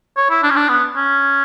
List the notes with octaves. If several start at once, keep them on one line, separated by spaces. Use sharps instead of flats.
C#5
E4
D4
C#4
D4
B3
C#4